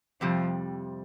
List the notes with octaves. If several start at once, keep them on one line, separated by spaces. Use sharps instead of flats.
F2 C3 F3 G3